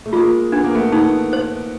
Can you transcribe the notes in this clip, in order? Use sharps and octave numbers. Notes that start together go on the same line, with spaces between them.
A3
G#3 A#3 F4
B3 D4
A#3
A3 B3
A3 B3 D#4
C5